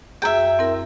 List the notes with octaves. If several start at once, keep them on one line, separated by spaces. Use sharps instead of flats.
F#2 G#4 E5 G5
C4 E4 A#4